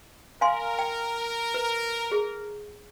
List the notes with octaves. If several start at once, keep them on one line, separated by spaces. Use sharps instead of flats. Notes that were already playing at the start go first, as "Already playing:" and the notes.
A#4 F5 G#5 C6
G5
B4
G#4